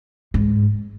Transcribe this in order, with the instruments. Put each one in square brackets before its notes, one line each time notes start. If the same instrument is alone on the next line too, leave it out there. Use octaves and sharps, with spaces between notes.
[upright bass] G#2